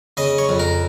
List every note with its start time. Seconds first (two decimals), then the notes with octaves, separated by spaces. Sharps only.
0.17 C#3 D#5
0.38 C#5
0.49 F2
0.59 A#4